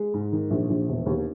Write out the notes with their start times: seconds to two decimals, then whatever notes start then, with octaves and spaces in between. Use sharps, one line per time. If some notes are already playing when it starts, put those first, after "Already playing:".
Already playing: G#3
0.14 G#2
0.32 D#3
0.50 A#1
0.70 A#1
0.89 E1
1.06 D#2